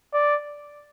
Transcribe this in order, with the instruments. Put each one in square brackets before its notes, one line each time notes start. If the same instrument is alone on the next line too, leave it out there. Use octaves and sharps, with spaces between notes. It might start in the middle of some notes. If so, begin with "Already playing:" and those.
[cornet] D5